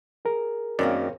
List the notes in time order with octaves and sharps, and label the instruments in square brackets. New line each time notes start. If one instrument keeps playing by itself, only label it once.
[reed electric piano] G#4 A#4
[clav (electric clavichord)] F#2 D#3 D5 [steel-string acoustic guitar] A#3 C4 C#4